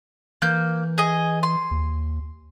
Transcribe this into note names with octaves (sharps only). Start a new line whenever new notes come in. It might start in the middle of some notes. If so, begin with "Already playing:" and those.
E3 A#3 G6
G#4 D#5
C6
D#2